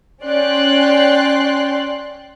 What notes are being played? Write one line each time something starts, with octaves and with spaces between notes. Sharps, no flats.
C#4 C#5 D5 G5 C6 F#6